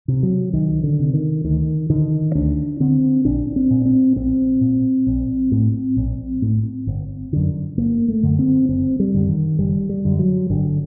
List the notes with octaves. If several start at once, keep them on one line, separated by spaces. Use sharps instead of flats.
C3
F#3
C2 D#3
D3
C3
D#3
D2 D#3
D3 D#3
D2 D4
D3 C4
A#1 D4
C4
A#2
C4
A#1 C4
A#2
A#1
A2
A#1
A2
G1
F#2 D3
G1 A#3
A3
F#2 D3
C4
F#1 C4
G3
F#2 D3
D#3
F#1 G3
G3
F#2 D3
F#3
G1 D3